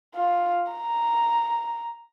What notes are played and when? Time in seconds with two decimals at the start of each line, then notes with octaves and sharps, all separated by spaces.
0.14 F4
0.72 A#5